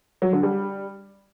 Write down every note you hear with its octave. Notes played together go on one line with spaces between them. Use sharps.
F#3
D3
G3